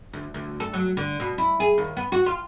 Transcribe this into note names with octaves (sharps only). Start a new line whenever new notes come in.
D2
D2
A4
F#3
D3
B2
E4
G#4
D#2
B3
F#4
F4